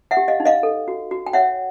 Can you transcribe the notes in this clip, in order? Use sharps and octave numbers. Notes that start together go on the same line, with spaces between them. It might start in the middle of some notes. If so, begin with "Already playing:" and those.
E5 F#5
G4
D#5 F5
D#4
D#5 F5
A4
F#4
F#4
G5
C#5 E5 F#5